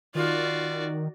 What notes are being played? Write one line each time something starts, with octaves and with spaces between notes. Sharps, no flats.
D#3 F4 F#4 D5